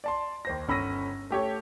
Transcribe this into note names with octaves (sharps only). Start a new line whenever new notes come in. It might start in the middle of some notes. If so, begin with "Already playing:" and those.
D5 A5 C6
D#2 C5 A#6
G1 C#4 B5 E6 A#6 D#7
A3 G4 C#5